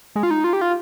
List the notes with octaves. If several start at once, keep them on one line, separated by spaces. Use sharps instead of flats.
G#3
F4
D#4
F4
G4
F4